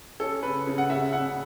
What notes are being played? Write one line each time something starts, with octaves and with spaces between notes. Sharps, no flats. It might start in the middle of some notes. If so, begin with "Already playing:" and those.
C#4 A4
C#3 B4
C#3
F#5
C#3 E5
C#3 F#5